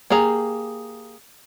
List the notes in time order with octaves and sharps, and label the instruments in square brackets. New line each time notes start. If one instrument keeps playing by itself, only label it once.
[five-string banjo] A#3 G4 G#4 A#5